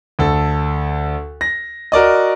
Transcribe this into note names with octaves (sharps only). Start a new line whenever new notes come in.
D2 A4
A#6
F#4 A#4 D5 D#5